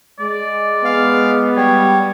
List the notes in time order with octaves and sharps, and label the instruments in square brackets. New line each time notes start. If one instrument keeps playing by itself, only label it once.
[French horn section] G#3 [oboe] D5
[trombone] B3 [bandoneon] F5
[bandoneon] G3 [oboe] C#5